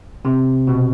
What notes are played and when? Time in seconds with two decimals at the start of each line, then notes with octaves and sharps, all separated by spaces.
0.25 C3
0.67 B2